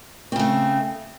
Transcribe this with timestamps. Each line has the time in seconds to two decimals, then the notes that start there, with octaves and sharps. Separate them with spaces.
0.32 C4
0.36 C#3
0.39 A3